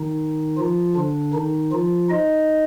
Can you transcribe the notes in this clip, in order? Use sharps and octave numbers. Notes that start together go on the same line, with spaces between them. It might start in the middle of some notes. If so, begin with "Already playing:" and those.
Already playing: D#3 D#4
F3 F4
D3 D4
D#3 D#4
F3 F4
D#4 D#5